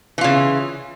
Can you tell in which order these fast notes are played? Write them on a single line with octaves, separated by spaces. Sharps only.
E3 F4 C#3